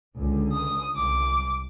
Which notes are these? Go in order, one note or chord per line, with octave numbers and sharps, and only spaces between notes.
C#2 D3
D#6
C2 D6